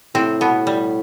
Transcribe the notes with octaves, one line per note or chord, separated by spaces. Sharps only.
A2 C3 C4
B2 B3
G3